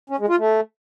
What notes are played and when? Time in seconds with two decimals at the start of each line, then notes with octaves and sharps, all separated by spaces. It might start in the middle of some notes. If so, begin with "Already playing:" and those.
0.10 C#4
0.19 G#3
0.29 F4
0.38 A3